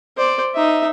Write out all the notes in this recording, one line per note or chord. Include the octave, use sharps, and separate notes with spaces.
C5 D5
D#4 E5